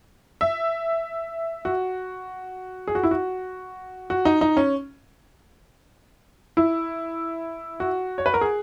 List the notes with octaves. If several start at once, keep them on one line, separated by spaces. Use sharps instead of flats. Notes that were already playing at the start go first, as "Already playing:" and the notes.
E5
F#4
G#4
F#4
E4
F#4
F#4
D#4
D#4
C#4
E4
F#4
C#5
B4
A#4
G#4